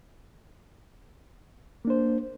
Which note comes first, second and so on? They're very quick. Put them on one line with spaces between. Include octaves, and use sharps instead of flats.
A#3 D4 C5